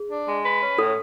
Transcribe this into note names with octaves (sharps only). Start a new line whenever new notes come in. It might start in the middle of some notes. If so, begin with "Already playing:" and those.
Already playing: G#4
D4
G#3
B4
C#4
A2 A4